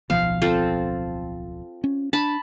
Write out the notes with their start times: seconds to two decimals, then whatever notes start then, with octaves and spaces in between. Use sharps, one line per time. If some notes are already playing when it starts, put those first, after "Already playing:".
0.10 D1 B1 F3 F5
0.42 C4 F4 A4
1.84 C#4
2.13 D4 A5 B5